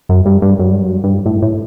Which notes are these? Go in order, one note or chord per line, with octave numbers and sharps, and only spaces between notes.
F#2
G2
G2
F#2
G2
F#2
G2
A2
A2